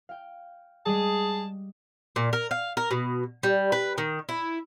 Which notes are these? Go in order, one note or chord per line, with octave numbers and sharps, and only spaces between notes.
F5 G5
G3 G#3 G#4 A5
A#2
A#4
F5
A#4
B2
G3
B4
D#3
E4